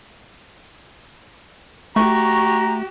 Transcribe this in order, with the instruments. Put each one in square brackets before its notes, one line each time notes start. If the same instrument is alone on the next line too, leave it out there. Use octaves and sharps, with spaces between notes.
[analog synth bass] A3 [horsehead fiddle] F#4 G4 [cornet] A#5 [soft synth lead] C#6